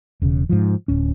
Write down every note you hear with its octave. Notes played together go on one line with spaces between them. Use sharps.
E1 C#3
G#2 F3
D1 C#4